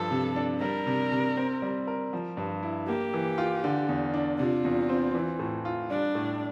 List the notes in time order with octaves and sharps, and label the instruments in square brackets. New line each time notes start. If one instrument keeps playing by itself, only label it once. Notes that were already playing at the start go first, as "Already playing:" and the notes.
Already playing: [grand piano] G2 F3 [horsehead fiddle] A4
[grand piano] C3
D4
[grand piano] G3 [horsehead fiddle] A#4
[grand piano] C3
C3
C4
G3
A#4
F3
G2
E4
[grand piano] A#3 [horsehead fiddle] G4
[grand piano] E3
F4
D3
E2
D4
[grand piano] C3 [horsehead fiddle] F4
[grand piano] E2
C4
E3
A2
F4
[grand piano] G3 [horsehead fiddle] D4
[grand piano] A2